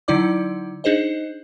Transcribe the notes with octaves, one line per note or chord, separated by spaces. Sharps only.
D3 F#3 D#4 E4 D5 D6
D4 D#4 G#4 C5 D#5